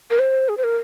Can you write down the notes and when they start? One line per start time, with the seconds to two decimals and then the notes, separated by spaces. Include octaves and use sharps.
0.11 A#4
0.19 C5
0.49 G#4
0.57 C5
0.64 A#4